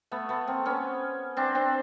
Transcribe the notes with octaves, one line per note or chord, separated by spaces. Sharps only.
A3 B3
A3 B3
A#3 C4
B3 C#4
C4 D4
C4 D4